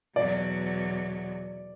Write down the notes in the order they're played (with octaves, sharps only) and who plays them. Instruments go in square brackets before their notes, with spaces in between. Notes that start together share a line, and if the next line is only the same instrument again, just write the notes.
[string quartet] E2 B2 F#3 [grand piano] D5